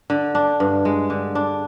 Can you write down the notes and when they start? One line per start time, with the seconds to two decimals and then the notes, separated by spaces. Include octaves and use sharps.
0.10 D3
0.35 D4
0.60 G2
0.85 G#3
1.10 D3
1.35 D4